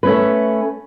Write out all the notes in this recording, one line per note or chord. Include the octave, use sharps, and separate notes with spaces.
A3 C#4 B4